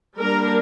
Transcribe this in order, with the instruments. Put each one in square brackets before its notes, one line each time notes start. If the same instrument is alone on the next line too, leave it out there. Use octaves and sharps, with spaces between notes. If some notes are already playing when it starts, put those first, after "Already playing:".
[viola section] G3 A#3 D4 A#4